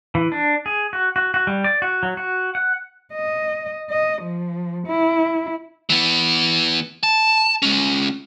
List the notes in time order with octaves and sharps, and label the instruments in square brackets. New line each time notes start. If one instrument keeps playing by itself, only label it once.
[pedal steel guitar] E3
D4
G#4
F#4
F#4
F#4
G3
D5
F#4
F#3
F#4
F#5
[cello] D#5
D#5
F3
E4
[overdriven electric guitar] E3 B3
A5
G#3 C#4